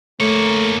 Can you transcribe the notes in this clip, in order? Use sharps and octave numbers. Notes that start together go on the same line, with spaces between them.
A3 A#3 C#5